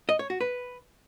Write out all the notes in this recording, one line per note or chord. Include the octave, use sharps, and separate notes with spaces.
D#5
C#5
F#4
B4